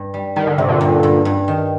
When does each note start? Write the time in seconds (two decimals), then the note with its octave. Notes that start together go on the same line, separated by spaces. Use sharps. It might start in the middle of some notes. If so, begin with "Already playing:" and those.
Already playing: G2
0.14 G3
0.36 D#3 G3
0.47 D3
0.58 G2 C3
0.69 A#2 D3
0.81 G2
1.03 G2
1.25 G2
1.48 D#3